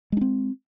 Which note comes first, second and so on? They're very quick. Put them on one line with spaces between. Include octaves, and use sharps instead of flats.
G#3 D4 C4